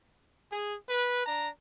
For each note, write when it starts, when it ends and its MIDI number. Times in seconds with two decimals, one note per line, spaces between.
0.52 0.74 68
0.89 1.21 71
1.26 1.49 62
1.26 1.49 82